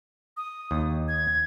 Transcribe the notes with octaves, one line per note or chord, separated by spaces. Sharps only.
D#6
D#2
G#6